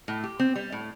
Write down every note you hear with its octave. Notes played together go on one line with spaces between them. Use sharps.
A2
G4
C4
G3
A2